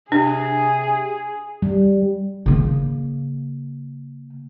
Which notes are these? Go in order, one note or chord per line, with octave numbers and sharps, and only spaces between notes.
C3 D4 G#4
G3
C#3 A#3